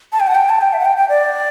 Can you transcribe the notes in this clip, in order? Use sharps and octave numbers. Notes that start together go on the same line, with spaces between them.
A5
G5
F#5
G5
A5
G5
E5
F#5
G5
G5
D5